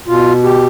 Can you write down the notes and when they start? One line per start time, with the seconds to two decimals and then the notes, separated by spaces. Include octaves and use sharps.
0.08 B2 F4
0.43 G4